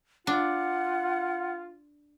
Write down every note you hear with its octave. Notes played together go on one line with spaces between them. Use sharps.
D4 F4 F#5